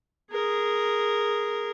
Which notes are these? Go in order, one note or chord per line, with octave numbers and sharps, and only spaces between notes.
G#4 A#4